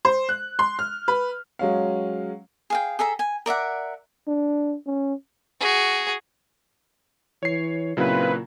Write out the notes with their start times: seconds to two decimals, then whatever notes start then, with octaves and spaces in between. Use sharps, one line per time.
0.05 C5
0.29 F#6
0.59 C6
0.79 F6
1.08 B4
1.59 F#3 G#3 C#4 F5
2.70 G#4 F5 G5
2.99 G#4 A4 E5 A#5
3.19 G#5
3.46 A#4 D5 E5 F#5
4.28 D4
4.86 C#4
5.60 F#4 G#4
7.43 E3 C#5 C7
7.97 A#2 C#3 F#3 C4 E4 F4 B4